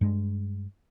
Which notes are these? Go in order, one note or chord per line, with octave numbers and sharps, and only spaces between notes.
G2 G#3